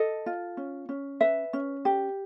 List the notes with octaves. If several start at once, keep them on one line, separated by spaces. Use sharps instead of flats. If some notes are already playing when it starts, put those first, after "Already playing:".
Already playing: A4 D#5
F4
C#4
C#4
B4 E5
C#4
G4